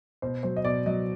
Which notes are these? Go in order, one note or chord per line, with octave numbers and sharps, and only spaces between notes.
B2 C5
F#3 C5
D#5
B2 D5
F#3 D#5